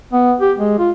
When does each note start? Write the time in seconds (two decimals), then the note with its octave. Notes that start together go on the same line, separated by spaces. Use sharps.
0.13 B3
0.40 G4
0.58 G#3
0.79 F4